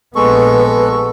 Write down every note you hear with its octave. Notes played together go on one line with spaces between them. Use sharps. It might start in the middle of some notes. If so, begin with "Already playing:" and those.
A#1 G#3 B3 A4 B4 C#6